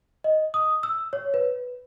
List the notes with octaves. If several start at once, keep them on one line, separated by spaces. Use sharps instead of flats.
D#5
D#6
E6
C#5
B4